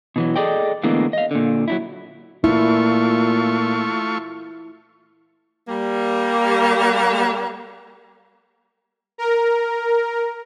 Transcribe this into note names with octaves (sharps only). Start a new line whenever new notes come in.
B2 E3 F#3
G#4 A4 D5 D#5 G5
A2 D3 E3 G#3 A#3 B3
D#5 F5
A#2 D3
F#3 D#4 E4
A#2 A3 E4 F4 C#6
G3 A#3
A#4